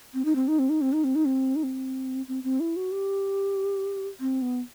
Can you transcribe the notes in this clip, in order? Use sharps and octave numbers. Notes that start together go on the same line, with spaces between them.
C4
D#4
C4
D#4
C4
D#4
C4
D#4
C4
D#4
C4
D#4
C4
C4
C4
E4
F#4
G4
C4
B3